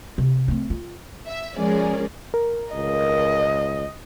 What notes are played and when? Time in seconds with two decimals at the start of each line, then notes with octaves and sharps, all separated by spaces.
0.18 C3
0.48 A3 C4
0.70 F4
1.27 E5
1.56 F3 G#3 C#4 G#4 A#4 D5
2.34 A#4
2.74 C#2 D#5